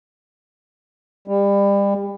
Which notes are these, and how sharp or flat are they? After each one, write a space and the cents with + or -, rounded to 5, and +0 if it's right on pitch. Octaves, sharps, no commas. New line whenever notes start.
G3 +30